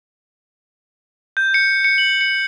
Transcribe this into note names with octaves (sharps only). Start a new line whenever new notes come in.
G6
C#7
C#7
F#7
C#7